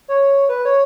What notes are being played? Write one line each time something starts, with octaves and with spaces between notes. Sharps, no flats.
C#5
B4
C#5